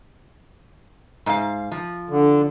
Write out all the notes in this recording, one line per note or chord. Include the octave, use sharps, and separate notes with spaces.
G#2 F5
F3
D3